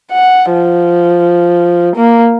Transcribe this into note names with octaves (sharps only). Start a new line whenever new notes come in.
F#5
F3
A#3